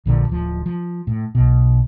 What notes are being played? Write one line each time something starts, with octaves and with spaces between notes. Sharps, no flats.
A#1 A#2 D3 F3
D1 F3
F3
A2
B1 B2